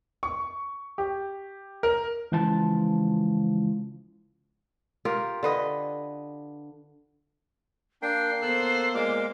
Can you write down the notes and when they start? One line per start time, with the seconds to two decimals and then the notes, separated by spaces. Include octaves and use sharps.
0.23 C#6
0.98 G4
1.83 A#4
2.32 C#2 E3 F3 A5
5.05 F4 G4 A#4
5.43 D3 B4 D#5
8.02 A#3 D4 G5 C7
8.42 B3 A4 C5 E6 F#6
8.94 A#2 G#3 A#3 F5 D6